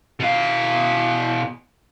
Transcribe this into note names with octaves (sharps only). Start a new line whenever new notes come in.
B2 F5